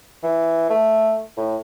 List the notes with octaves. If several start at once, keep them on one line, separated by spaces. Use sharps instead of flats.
E3
A3
A2